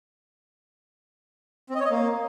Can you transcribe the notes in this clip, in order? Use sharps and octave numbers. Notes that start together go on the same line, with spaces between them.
C4
D#5
C#5
D#5
A#3